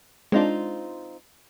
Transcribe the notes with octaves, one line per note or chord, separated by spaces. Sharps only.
G#3 C4 D4 D#4 F4